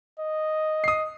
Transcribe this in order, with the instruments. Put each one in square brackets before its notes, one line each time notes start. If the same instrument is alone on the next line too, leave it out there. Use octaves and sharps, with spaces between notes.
[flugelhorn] D#5
[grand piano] D#6 C7